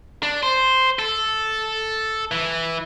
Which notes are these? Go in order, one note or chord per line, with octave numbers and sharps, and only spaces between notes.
D4
C5
A4
E3